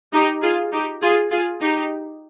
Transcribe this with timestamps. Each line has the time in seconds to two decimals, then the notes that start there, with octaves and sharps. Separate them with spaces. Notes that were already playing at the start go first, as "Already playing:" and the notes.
0.13 D#4 G4
0.42 F4 G#4
0.72 D#4 G4
1.02 F4 G#4
1.30 F4 G#4
1.60 D#4 G4